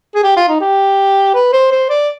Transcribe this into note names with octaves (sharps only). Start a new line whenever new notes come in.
G#4
G4
F4
D#4
G4
B4
C5
C5
D5